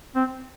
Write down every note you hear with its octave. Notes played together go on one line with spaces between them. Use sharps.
C4